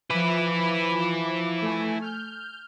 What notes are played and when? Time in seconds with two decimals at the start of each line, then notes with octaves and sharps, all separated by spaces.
0.10 F3 E4 B4 D6
1.62 A3 G#5
2.02 F6 G6